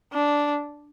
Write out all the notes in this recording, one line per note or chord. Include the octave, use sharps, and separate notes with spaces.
D4